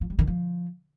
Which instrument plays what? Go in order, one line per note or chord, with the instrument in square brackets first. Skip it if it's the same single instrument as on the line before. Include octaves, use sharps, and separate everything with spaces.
[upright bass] F3
G3
D#3
F3